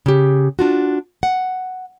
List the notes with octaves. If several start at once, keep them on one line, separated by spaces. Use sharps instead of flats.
C#3 G4
D4 F4 F#4
F#5